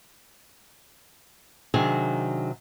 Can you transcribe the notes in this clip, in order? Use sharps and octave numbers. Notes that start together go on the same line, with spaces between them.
C3 D#3 F#3 D4 G#4